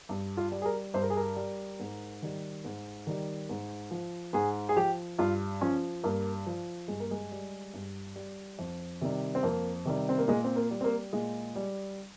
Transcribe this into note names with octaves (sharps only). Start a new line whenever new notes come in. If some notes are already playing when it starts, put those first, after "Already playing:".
G2
F4
G3
G#4
A#4
G2 C5
A#4
G#4
A#4
G3
G#2
D#3 G3
G#2
D#3 G3
G#2
F3
G#2 G#4
G#4
F3 G4
G2 F4
F3 C#4
G2 A#3
F3
G2 G#3
A#3
G#3
G3
G2
G3
F2
C3 D#3 G3
C4
F2 A#3
C3 D#3 G3
C4
A#3
A#2 G#3
C4
A#3
G3
C4
A#3
A#2 G#3
G3